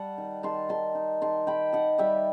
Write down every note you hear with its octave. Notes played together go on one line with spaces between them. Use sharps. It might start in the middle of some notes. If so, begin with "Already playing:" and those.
Already playing: G3 F#5 A5
D#3
D#3 A5 C6
D#3 A5 C6
D#4
D#3 A5 C6
D#3 G5 B5
D#3 F#5 A5
G3 E5 G5